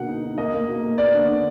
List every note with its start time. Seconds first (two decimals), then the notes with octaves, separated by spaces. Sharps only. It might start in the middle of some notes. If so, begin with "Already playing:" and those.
Already playing: B2 D3 A#3 F#5
0.08 D#4
0.23 D#4
0.38 A#3 D#5
0.54 A#3
0.68 B2
0.83 A#3
0.98 B3 D5
1.13 D3
1.29 D3